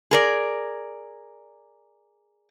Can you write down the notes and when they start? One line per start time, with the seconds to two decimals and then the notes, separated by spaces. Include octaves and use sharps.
0.11 G#4 A#4 D5